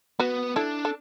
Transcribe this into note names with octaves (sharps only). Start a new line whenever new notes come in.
B3 F#4 B4
D4 E4 A4
A4